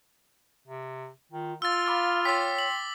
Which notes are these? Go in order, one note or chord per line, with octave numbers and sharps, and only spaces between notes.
C3
D#3 F4
F4 F5 E6 A6
B5 D6 F6
C#5 G5 C6 D6 E6 B6
F#7